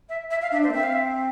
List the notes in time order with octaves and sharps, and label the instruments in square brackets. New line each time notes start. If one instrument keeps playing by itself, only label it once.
[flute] E5
E5
F5
[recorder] D4 [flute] E5
[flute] C5
[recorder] A#3
[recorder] C4 [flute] E5
[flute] F5
E5